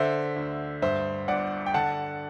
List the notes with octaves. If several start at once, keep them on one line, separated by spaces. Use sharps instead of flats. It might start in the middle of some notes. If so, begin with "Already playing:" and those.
Already playing: D3 C5 E5
D2
G2 C5 E5
G1 D5 F#5
G5
D3 F#5 A5